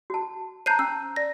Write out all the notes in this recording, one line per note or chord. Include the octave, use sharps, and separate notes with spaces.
F#4 A5
C5 A5 A#5 G6 C7 D#7
C#4 E6
D5 A#6